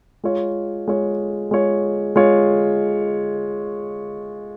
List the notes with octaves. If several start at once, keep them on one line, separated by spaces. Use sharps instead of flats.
G#3 F4 C#5
G#3 F4 C#5
G#3 F4 C#5
G#3 F4 C#5